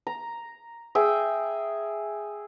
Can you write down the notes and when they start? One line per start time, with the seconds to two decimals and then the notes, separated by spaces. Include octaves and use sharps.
0.07 A#5
0.95 G#4 E5 G5